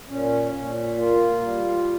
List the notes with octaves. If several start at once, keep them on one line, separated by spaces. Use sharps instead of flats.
A#2 C#4
A#2
A#3 F4
G3